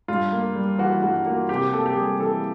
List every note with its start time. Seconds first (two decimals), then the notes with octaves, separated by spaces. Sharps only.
0.08 G2 F4
0.32 A#3
0.55 G3
0.79 E3 F#4
1.02 G2 F#4
1.26 A#3 F#4
1.49 C3 G4
1.73 A#3 A4
1.86 G4
1.96 G3 G#4
2.19 E3 A4